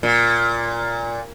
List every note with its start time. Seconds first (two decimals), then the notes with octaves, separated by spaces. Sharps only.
0.03 A#2